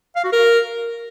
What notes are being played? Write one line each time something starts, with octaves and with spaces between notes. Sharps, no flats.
F5
F#4
A#4